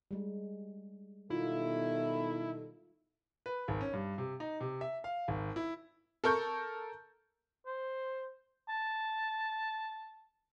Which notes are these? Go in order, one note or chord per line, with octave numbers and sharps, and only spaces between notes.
G3 G#3
B2 D#3 G3 E4 F4 A4
B4
G#1
C#4
G2
C3
D#4
C3
E5
F5
G#1
E4
A4 A#4 C#6 G6
C5
A5